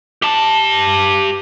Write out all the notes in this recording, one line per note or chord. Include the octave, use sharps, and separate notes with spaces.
G4 A5